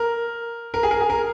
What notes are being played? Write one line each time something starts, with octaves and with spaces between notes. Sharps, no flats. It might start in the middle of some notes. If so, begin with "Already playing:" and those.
Already playing: A#4
A#4
G#4
A#4
G#4
A#4